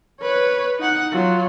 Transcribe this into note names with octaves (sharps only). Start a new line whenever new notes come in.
B4 C#5
D#4 F#5
F#3 F4